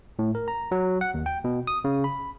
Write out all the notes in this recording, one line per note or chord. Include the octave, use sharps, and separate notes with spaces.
A2
A#4
A#5
F#3
F#5
D#2
G5
B2
D#6
C#3
B5